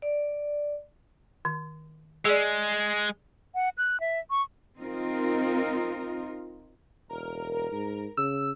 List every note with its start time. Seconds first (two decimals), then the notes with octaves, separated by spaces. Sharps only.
0.02 D5
1.45 D#3
2.25 G#3 G#4 D5
3.55 F#5
3.78 F#6
4.00 E5
4.30 C#6
4.80 C4 D#4 F4 A#4
7.09 E1 A#4
7.71 G#2
8.17 C#3 E6